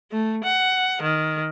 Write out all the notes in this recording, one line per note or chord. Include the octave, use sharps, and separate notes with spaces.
A3
F#5
D#3